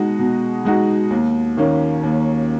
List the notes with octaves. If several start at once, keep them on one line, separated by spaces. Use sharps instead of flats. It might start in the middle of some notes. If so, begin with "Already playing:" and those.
Already playing: B2 G#3 D#4 F#4
B2
G#3 D#4 F#4
D#2
D#3 A#3 C#4
D#2